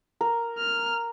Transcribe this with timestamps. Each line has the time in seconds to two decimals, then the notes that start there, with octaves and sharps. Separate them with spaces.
0.21 A#4
0.58 F6